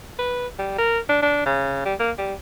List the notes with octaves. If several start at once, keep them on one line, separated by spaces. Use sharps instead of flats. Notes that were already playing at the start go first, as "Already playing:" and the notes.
B4
G3
A#4
D4
D4
C#3
G3
A#3
G3